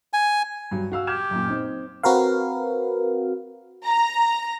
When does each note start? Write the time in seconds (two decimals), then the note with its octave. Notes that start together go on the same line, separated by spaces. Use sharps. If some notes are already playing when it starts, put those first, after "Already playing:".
0.13 G#5
0.71 G2 F#3
0.92 F#4 F5 E6
1.07 G4 F6 G#6 E7
1.31 F#2 A#2
1.48 C4 D#4
2.03 C4 F#4 A#4 B4 F5
3.84 A#5